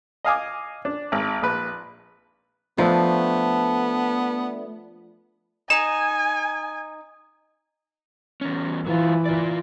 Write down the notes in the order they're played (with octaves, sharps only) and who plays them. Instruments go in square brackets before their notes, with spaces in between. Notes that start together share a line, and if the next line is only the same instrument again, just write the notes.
[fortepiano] D#5 F5 G#5 D6
D4
G#1
A#1 B4
[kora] F3 [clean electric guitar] A3 D4 [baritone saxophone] B3
[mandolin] D#4 [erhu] G#5 [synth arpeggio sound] E7
[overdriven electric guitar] E2 C#4
[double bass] E3 [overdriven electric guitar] F#3 F4
[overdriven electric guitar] F4 D5